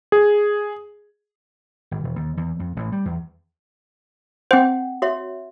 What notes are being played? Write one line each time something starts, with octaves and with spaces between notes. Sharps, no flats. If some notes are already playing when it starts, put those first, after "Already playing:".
G#4
G#1
E1
D#2
E2
F2
A1
G3
E2
C4 C5 F#5 G5
F#4 C#5 E5